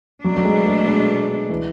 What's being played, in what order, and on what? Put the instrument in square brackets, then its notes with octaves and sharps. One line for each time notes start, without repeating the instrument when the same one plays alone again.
[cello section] B2 A3 D4 [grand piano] F#3
[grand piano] F#3
G#3
G#3
G#3
E3